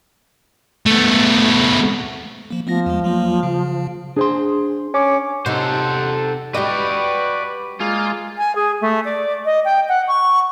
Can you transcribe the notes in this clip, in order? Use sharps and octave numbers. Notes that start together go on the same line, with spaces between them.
A3 B3
F3 A#3
F3 A3 B3 A#6
E2 G#3
F#3 G3 A#3
C#3
D4 G#4 C5 C6
C#4 D6
C3 D#4 A4 C5 F#5
G3 F#4 B4 D5 D#5 G5
G#3 A#3 F4
G#5
G#4
A3
D5
D#5
G5
F#5
C#6